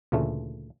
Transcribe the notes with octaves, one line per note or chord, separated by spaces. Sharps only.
D2 A#2 C#3 E3 A3